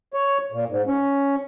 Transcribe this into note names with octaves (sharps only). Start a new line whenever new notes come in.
C#5
A#2
G#2
C#4